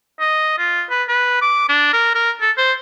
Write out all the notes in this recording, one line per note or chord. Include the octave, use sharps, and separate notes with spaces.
D#5
F4
B4
B4
D6
D4
A#4
A#4
A4
C5